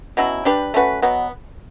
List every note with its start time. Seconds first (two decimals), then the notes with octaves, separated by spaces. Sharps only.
0.17 B2 F#3 C#4 E4
0.45 G3 D4 G4 B4
0.74 A3 C#4 F#4 B4
1.02 B2 F#3 B3